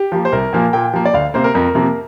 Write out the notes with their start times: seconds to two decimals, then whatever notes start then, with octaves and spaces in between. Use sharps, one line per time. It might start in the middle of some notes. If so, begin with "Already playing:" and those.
Already playing: G4
0.12 F3 A#3
0.25 C5
0.32 C2 A#4
0.53 A#2 F3 A#3
0.73 A#2 G5
0.93 F3 A#3
1.05 D5
1.14 D2 F5
1.34 C3 A#3 C5
1.44 A#4
1.54 F2 A#4
1.75 C3 F3 A#3